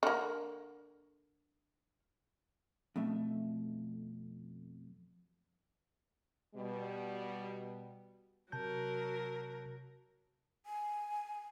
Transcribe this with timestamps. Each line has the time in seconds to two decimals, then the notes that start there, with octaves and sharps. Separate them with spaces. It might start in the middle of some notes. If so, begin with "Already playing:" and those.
0.03 D3 A#3
2.96 F2 B2 A3 E5
6.55 B2 G3
8.52 C3 F#3 A#4 A5 G6
10.66 G#5